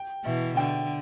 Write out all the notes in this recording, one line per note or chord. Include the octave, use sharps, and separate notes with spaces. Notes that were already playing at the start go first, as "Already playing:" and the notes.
Already playing: G5
B2 E3 E5
D3 G5